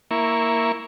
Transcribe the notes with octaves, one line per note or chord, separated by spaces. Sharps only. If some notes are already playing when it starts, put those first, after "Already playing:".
A#3 E4 C#6